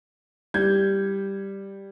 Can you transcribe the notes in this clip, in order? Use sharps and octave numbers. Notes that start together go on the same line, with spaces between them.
G3 G6 G#6